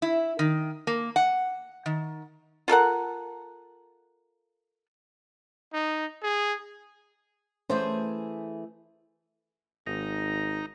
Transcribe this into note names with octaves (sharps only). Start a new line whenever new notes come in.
E4
D#3
A#3
F#5
D#3
F4 A4 A#4 F#5
D#4
G#4
E3 A3 C#4 G#4 C5
G#1 D#4 A#5